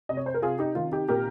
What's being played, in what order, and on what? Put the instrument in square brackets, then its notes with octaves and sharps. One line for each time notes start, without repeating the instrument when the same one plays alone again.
[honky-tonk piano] C3 D#5
C#5
C5
A#4
C3 F4 G#4
D#4 G4
D#3 F4
D#4 G4
A#2 G4 A#4